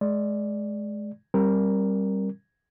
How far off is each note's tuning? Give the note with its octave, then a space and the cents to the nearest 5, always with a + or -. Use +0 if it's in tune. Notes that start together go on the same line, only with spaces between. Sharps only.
G#3 +25 D5 +0
G3 +0 C4 +40 A#4 +0